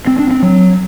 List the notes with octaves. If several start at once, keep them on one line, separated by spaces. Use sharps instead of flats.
C4
D4
C4
F#3